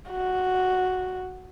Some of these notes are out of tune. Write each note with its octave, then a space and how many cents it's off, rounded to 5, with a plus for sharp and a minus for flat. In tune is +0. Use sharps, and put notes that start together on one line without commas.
F#4 -5